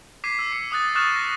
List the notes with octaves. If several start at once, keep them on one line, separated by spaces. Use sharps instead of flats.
D6 G#6 B6 C7 D#7
E6
D6 C#7
D6 D#6 F#6 A6
C#6 D#6 F6 F#6 A6 E7
A#6